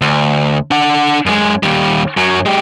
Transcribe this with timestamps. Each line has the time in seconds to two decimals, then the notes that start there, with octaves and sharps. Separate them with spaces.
0.01 D2
0.71 D4 F#5
1.26 F#2 G#3
1.63 D#2 G3
2.17 F#2 F#3
2.46 G#3 G4